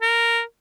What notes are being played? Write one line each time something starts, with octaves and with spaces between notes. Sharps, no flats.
A#4